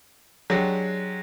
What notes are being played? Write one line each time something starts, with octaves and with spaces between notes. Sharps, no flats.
F#3 G#3 D4 G4